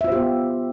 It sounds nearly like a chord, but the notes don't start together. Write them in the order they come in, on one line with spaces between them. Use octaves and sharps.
E5 F4 C5 G4 B3